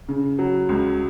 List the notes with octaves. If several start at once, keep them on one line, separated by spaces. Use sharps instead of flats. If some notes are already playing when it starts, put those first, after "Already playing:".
C#3
F#3
C#2